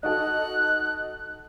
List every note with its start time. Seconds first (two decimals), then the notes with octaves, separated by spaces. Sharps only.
0.03 D#4 F#4 A4 F#6